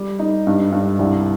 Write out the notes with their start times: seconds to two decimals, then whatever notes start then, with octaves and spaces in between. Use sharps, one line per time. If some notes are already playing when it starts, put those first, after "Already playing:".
Already playing: G3
0.19 D#4
0.47 G2
0.72 G2
0.99 C2